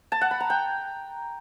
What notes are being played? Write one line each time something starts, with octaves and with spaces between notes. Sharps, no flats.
A5
F#5
B5
A#5
G5